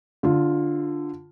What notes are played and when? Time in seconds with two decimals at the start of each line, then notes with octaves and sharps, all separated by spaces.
0.23 D3 F4